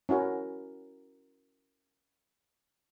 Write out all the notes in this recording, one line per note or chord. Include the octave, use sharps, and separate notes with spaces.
C#4 E4 F#4 A#4